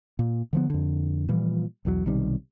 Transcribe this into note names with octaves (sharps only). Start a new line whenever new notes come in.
A#2
D3 F3 B3
F2 D3
A#2 E3 F3 G3
B1 E2 E3 F#3
B1 C3 D#3 G3